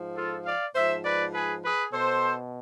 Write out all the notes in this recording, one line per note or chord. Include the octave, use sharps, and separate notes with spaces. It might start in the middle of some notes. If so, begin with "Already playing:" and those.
Already playing: G#2 F3
F4 A4
D5 F5
G#2 F3 C5 E5
B4 D5
G#4 B4
G#4 B4
B2 A4 C5